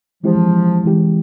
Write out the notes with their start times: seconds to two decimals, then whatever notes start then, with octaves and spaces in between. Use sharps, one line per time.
0.24 E3 F3 G#3 C4 E4 G4
0.85 E3 G#3 C4 E4 G4